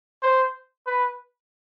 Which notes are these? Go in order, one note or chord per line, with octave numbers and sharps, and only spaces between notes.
C5
B4